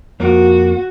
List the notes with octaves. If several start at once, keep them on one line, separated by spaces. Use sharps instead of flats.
F2 A#3 F#4 A#4